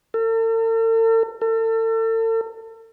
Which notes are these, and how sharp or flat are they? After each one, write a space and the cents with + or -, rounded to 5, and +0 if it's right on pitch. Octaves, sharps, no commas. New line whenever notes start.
A4 +45
A4 +40